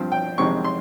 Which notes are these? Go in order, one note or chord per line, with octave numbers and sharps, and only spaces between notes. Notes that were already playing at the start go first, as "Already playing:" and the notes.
Already playing: G2 F3 C4
G5
F2 C3 D#3 G#3 C4 C#6
C6